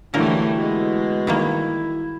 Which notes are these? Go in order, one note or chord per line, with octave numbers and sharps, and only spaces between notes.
D3 E3 F#3 G3 A3 A#3 E4 A#4
B2 G#3
D#3 G3 A#3 E4